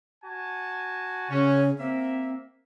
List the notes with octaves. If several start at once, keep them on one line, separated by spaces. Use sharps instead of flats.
F#4 G#5 A5
C#3 C#4 F#4 C#5
A#3 C4 E5